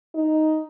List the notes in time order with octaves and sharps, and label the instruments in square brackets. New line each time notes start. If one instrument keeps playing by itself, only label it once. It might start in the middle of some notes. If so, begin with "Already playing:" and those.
[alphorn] D#4